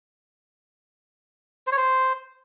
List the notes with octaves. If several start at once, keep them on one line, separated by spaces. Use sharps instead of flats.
C5
C#5
C5